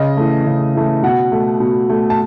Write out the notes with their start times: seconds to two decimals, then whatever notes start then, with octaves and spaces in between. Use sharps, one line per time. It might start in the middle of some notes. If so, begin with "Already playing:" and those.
Already playing: C#3 D#5
0.17 E3 A3
0.46 C#3
0.75 E3 A3
1.03 B2 F#5
1.32 A3
1.60 B2
1.90 A3
2.10 A5